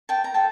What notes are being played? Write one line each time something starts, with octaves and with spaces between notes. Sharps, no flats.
G5 A5
A#5
F4 A4 G5 A5